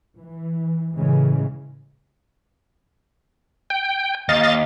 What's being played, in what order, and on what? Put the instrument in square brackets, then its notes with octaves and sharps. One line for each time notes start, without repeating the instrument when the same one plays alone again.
[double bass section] E3
A2 C#3 E3 G#3
[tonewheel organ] G5
[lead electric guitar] D#2 [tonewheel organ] D#5 F5 A6